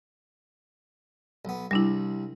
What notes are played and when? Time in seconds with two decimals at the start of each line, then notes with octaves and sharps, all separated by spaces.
1.45 B1 B3
1.71 C2 G3 D4 E4